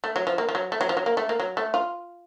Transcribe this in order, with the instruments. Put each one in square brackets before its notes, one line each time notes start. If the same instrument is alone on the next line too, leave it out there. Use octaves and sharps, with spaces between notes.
[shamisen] A3
F#3
F3
A#3
F3
F#3
A3
F#3
F3
F#3
A#3
A3
A#3
F#3
A3
F4